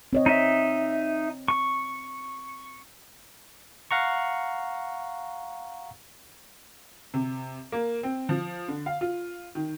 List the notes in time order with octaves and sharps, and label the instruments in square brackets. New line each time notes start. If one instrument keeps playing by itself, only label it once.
[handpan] C4 C#5 D#5
[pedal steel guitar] D#4 E5
C#6
[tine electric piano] F5 F#5 A#5 C#6
[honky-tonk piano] C3
A#3
C4
F3
D3
F5
F4
D#3